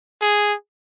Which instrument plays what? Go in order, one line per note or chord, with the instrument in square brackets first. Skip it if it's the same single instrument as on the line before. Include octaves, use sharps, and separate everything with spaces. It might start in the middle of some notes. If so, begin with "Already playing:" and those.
[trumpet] G#4